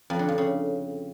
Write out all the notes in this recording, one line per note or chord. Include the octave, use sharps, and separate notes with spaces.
F2
D3
F2
C#3